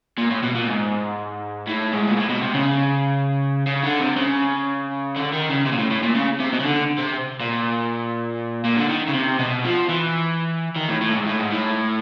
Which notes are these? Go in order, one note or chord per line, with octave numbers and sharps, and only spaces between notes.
A#2
A2
B2
A#2
G#2
A2
G#2
A#2
A2
B2
C3
C#3
C#3
D3
C3
C#3
D3
D#3
C#3
C3
A#2
A2
A2
A#2
C#3
C3
B2
C#3
D3
C3
A#2
A#2
D3
D#3
C#3
C3
B2
F3
E3
D#3
A2
A2
G#2
A2
G#2
A2